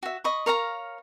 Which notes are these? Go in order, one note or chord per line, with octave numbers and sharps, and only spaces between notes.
F#4 E5
D#5 B5 C#6
A#4 C#5 F5 A#5